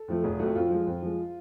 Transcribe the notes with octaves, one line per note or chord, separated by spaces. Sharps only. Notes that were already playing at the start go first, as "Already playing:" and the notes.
Already playing: A4
F2 F3 A3
F1 G#4
F2 F3 A3 F#4
F2 F4
F3 G#3
F2
F3 G#3